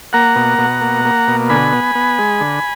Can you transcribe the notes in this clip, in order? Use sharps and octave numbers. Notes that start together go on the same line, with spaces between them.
A#3 F#5 A#5
B2
B2
A#3
A#3
B2
D3 G#5 B5
B3
B3
G#3
D3